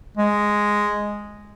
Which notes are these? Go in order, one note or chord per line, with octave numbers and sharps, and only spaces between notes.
G#3